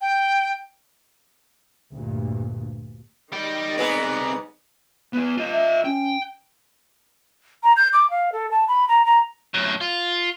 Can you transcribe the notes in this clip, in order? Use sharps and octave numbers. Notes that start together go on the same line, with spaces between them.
G5
D2 G2 A#2
D#3 G3 D#5 G5
C2 G#2 B3 G#4 D5
B3 E4
F4 D#5
E5
C#4 G5
A#5
G6
D6
F5
A4
A5
B5
A#5
A#5
F#2 A2
F4